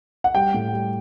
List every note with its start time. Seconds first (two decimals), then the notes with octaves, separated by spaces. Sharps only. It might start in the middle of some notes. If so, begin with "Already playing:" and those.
0.24 F#5
0.35 G3 G5
0.54 A2
0.73 G3